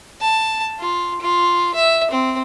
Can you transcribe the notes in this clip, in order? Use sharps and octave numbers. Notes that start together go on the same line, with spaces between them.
A5
F4
F4
E5
C4